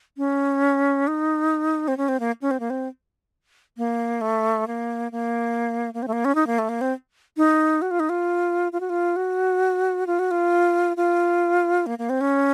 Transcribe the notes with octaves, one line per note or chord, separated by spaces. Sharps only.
C#4
D#4
C4
C#4
C4
A#3
C#4
C4
A#3
C4
A#3
A3
A#3
A#3
A#3
C4
A3
A#3
C#4
D#4
A#3
A3
A#3
C4
D#4
F#4
F4
D#4
F4
F4
F#4
F4
F#4
F4
F#4
F4
F4
A#3
A#3
C4
C#4